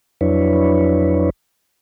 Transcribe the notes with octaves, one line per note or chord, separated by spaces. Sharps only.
F2 F#3 D4 E4 B4 C#5